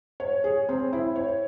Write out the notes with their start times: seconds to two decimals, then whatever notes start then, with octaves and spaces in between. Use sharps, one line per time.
0.20 C#5
0.44 G#4
0.69 C4
0.93 E4
1.16 C#5